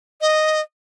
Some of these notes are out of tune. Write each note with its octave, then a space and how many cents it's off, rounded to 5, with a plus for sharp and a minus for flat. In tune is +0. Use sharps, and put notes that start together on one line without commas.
D#5 -5